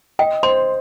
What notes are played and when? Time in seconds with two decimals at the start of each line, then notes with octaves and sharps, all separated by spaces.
0.19 D#5 G5
0.43 C5 C6